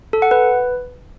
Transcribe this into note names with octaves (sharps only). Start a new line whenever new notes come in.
A4
F#5
B4